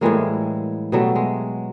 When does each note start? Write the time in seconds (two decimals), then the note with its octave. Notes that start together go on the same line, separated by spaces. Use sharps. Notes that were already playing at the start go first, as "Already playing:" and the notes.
0.01 A2 E3 G3 G#3 A#3
0.92 B2 F#3 G3 A3
1.16 G#3